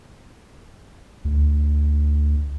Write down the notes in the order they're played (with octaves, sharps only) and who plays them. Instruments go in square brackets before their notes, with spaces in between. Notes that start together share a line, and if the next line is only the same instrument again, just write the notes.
[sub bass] D2